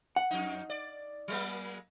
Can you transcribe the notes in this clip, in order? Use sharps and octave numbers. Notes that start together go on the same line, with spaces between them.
F#5
F2 D#4
D5
F#3 G#3 A#3